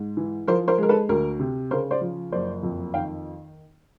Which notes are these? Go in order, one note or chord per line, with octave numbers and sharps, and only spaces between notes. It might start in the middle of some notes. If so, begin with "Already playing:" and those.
Already playing: G#2
E3
F3 A#4 C5
A#4 C5
G#3 A#4
A4 B4
D2 A#4
C3
C#3 A#4 C5
C5 D5
F3
F#1 C5 D5
F2
D#3 F5 G5